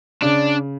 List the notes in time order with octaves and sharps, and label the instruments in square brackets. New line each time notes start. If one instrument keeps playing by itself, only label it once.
[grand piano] C#3 [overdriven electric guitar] D4